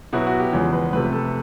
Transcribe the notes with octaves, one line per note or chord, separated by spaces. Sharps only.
B2 F#3 B3 E4 F#4
F#4
G4
E2 C#3 F3 G#3
B4
C3 F3 A3 B4
A4